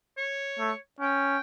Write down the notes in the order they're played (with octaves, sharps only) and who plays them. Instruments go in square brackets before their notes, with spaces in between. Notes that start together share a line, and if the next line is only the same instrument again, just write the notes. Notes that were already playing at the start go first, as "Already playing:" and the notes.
[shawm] C#5
[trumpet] A3
[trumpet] C#4 [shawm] G5